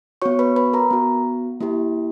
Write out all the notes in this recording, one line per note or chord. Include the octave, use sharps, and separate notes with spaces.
B3 F#4 C#5 C#6
B4 B5
B4 B5
A#4 A#5
B3 F#4
A#3 E4 G4